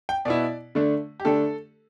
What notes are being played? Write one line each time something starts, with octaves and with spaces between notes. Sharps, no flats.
G5
B2 B3 E4 D5
D3 A3 D4
G4
D3 A3 D4 A4